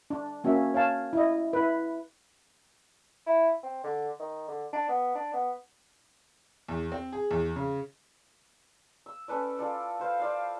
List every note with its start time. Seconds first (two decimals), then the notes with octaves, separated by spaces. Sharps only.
0.10 D4
0.44 A#3 C#4 F#4 E5
0.74 C#5 F5 A5
1.13 E4 D#5
1.53 E4 B4
3.26 E4
3.63 C4
3.84 D3
4.19 D#3
4.48 D3
4.73 D4
4.89 B3
5.15 D4
5.34 B3
6.68 E2
6.92 C4
7.13 G#4
7.31 E2
7.56 C#3
9.06 E6
9.28 C#4 A4 B4 D5
9.59 F4 A4 D5
9.99 B4 C5 F5
10.20 F4 D5 F5